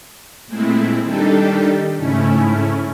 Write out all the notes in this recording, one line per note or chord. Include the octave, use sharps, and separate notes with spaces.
A#2 G#3 A3 C4 E4
D#3 G3 D4 D#4 G4 A4
G#2 C#3 A3 C#4 E4